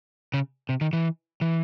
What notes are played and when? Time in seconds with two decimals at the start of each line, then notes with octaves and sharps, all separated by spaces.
0.34 C#3
0.69 C3
0.81 D#3
0.93 E3
1.41 E3